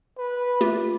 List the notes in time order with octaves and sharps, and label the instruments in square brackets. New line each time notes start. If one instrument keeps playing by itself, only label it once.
[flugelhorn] B4
[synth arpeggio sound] A3 F4 G4